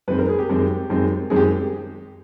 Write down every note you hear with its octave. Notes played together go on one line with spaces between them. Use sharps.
F#2 D#3 G#3 C4 B4
A#4
G#4
G4
F#2 D#3 G#3 C4
F#2 D#3 G#3 C4
F#2 D#3 G#3 C4 G#4
G4
G#4